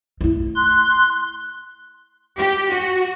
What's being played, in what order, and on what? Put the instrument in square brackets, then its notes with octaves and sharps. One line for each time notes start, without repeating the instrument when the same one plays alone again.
[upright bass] A3 E4
[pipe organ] C6 F#6
[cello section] G4
F#4